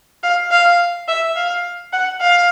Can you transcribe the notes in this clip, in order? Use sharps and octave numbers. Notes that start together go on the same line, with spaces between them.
F5
F5
E5
F5
F#5
F5